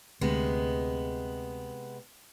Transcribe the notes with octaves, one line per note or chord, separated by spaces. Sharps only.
D2 C3 G#3 B3